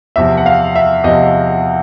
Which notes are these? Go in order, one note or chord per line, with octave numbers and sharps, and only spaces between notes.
E2 C3 F3 E5
F#5
F5
E5
E2 C3 F3 D#5